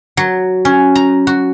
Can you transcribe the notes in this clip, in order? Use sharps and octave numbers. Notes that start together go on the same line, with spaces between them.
F#3
C#4
A#5
F#4